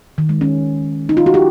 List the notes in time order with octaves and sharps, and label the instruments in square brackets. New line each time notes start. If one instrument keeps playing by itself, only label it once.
[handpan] D#3
G#3
C#4
D#4
F4
F#4
G4